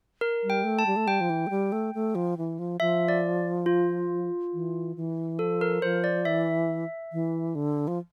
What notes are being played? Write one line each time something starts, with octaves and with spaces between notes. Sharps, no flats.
A#4
G3
G5
A3
A5
G3
A3
G3 G5
F3
E3
A3
G3
A3
A3
F3
E3
F3
F3 E5
D5
F4
E3
E3
F3 A4
A#4
F3 C5
D5
E3 E5
E3
D3
F3